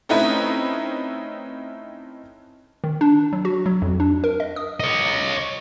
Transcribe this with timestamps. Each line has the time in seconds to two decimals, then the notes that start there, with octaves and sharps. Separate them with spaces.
0.09 A3 C4 C#4 D#4 E4 B4
2.84 D#3
3.01 D4
3.33 F#3
3.45 F#4
3.66 F#3
3.82 F2
4.00 D4
4.24 A#4
4.40 D#5
4.56 D#6
4.80 C#5 D#5